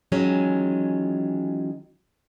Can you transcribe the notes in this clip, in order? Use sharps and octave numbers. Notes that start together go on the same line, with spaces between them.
D#3 E3 F#3 G#3 C#4 F4